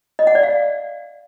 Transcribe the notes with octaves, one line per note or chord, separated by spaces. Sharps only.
D#5
F#5
D5
F5